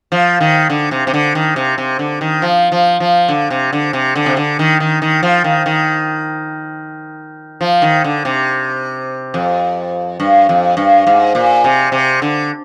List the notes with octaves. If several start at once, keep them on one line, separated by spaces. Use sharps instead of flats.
F3
D#3
D3
C3
C3
D3
D#3
C3
C3
D3
D#3
F3
F3
F3
D3
C3
D3
C3
D3
C3
D3
D#3
D#3
D#3
F3
D#3
D#3
F3
D#3
D3
C3
F2
G2
F2
G2
G#2
A#2
C3
C3
D3